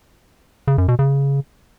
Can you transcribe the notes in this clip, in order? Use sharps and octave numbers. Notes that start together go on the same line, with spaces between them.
C#3
F#2
B2
C#3